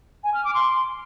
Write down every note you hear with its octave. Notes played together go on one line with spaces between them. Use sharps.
G#5
F6
D6
C6